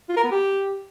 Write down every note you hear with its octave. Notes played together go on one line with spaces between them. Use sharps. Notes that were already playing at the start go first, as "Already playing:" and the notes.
F4
A#4
B3
G4